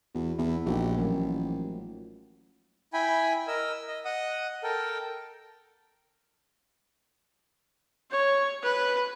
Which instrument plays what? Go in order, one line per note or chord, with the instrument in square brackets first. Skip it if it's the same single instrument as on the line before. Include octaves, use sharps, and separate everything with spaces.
[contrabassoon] E2 [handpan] F#4
[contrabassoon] E2 [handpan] E4
[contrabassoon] A#1 [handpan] D#4 F#4 G4
[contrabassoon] A1 [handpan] F3 F#3 A#3
[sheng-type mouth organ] E4 G5 G#5 B5
A#4 D#5 E6
D#5
D#5 F#5 D#6
A4 A#4 G5
[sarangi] C#5
B4